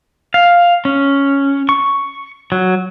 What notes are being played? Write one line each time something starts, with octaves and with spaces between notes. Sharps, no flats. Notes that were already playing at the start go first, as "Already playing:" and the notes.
F5
C#4
C#6
F#3